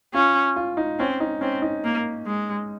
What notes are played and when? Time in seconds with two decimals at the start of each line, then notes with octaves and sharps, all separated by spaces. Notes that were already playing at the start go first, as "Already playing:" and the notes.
0.14 C#4 F4
0.56 F4
0.77 D#4
0.99 C4 C#4
1.20 D#4
1.41 C4 C#4
1.62 D#4
1.84 A#3
2.26 G#3